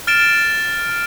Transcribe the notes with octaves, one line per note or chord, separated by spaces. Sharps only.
F6 A6 D7 E7